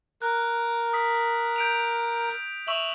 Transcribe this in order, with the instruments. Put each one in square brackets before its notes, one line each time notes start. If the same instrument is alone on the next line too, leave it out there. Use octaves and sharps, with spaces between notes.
[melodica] A#4 [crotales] F#6
[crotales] D#6 B6
G6 D7 F7
[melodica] E5 [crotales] C#6 F7 F#7